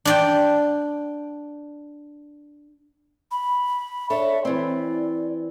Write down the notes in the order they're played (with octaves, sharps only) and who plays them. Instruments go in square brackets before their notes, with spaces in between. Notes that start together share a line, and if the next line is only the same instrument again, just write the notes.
[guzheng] D4 D5 G5
[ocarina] B5
[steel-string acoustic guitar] D4 A4 C#5 [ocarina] E5
[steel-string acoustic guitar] E3 C4 [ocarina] D5